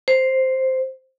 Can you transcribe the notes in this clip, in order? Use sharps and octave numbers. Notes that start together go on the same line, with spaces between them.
C5